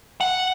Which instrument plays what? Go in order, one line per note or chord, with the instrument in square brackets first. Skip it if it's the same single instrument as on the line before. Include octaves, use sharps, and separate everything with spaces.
[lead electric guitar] F#5